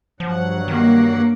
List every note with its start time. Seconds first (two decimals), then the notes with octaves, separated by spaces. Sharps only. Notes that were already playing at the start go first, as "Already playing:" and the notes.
0.20 G2 F3 F#3 F#5
0.68 D#3 A#3